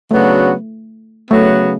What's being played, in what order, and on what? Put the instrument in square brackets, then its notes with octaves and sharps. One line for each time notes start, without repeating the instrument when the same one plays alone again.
[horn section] C#3 F#3 B3 D4 F#4 [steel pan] A3
[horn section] C#3 F#3 B3 [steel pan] A3